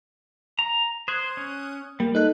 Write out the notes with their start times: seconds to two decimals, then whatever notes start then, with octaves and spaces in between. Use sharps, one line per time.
0.59 A#5
1.08 C5 D#6 F#6 G#6
1.37 C#4
2.00 G3 A#3
2.15 D#4 A4 B4 F#6